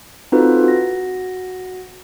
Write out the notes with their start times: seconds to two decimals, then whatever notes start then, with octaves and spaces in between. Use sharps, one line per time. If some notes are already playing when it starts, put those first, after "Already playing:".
0.32 C4 D#4 F4 F#4 A4 B4
0.64 F#4 A#6